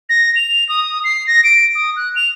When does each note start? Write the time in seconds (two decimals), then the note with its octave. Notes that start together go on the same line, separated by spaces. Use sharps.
0.09 A#6
0.36 F7
0.69 D#6
1.04 C7
1.27 A#6
1.44 D7
1.75 D#6
1.96 F#6
2.16 F7